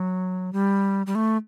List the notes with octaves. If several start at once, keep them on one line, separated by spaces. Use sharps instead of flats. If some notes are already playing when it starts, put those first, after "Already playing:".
Already playing: F#3
G3
G3
A3